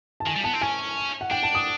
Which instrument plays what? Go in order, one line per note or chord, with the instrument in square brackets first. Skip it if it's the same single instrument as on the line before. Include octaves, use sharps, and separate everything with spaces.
[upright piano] A5
[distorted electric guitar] D#3 [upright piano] G#5
[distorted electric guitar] G3
[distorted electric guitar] B3 [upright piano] A5
[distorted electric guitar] C4
[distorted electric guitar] C#4 [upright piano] G#5
[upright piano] F#5
[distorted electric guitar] D4 [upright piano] G5
[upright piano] A5
D#6